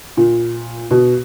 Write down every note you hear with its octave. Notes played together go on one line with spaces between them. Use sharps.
A#2
B2